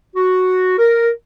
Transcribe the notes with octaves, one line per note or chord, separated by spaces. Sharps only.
F#4
A#4